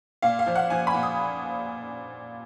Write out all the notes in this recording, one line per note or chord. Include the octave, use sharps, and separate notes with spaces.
A#2 F5
F5
F3
F#5
F3 G#5
B5
A#2
D#6